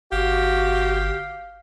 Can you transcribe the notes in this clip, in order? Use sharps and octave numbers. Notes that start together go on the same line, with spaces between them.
G1 F#4 G4 F5